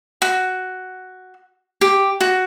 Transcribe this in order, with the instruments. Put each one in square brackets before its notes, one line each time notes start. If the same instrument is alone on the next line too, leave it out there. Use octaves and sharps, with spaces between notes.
[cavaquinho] F#4
G4
F#4